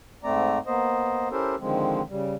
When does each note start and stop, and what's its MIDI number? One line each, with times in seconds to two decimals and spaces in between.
0.24 0.58 44
0.24 0.58 57
0.24 0.58 60
0.24 0.58 74
0.24 0.58 82
0.67 1.29 58
0.67 1.29 59
0.67 1.29 72
0.67 1.29 75
1.31 1.55 61
1.31 1.55 64
1.31 1.55 67
1.31 1.55 69
1.31 1.55 70
1.31 1.55 72
1.60 2.02 50
1.60 2.02 51
1.60 2.02 53
1.60 2.02 56
1.60 2.02 60
2.10 2.35 49
2.10 2.35 55